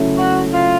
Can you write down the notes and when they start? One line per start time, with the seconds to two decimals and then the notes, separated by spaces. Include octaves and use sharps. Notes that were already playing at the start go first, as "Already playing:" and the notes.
Already playing: C#3 F#3 A3 C#4 E4
0.17 F#4
0.52 F4